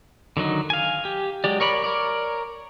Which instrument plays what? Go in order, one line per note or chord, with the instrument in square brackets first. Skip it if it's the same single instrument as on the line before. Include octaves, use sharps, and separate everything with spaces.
[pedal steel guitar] D3 D#3 F#3 D#4
F5 G#5
G4
F#3 G#3 G4 D5
A#4 C#5 D5 B5
A#4 C#5 D5